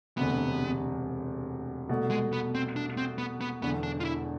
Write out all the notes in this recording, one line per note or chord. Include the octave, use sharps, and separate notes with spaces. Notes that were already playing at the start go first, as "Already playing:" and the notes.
E1 D2 C3 B3
C2 B2 A3
G#3
B3
C4
D4
C4
B3
B3
E1 E2 D3 B3
D4
F4
E4